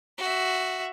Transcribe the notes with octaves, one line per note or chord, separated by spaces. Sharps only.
F#4 E5